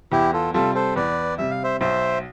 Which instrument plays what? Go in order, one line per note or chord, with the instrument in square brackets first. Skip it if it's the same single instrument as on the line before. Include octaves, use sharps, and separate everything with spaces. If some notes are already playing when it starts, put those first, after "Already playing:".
[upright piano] E2 [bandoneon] E4 G4
[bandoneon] F4 A4
[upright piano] C3 G3 [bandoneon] F4 A4
[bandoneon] A4 C5
[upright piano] E2 [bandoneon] B4 D5
[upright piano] C3 G3 [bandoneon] E5
[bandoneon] F5
C5 E5
[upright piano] B1 [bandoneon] C5 E5